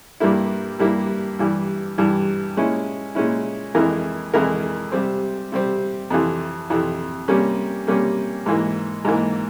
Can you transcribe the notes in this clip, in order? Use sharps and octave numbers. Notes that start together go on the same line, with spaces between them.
G2 G3 A#3 E4
G2 G3 A#3 E4
G2 E3 G3
G2 E3 G3
A#2 G#3 C#4 E4
A#2 G#3 C#4 E4
F2 E3 G#3 E4 A#4
F2 E3 G#3 E4 A#4
C3 G3 C4
C3 G3 C4
F2 C3 E3
F2 C3 E3
C3 G3 A#3 C#4
C3 G3 A#3 C#4
G#2 E3 A#3
G#2 E3 A#3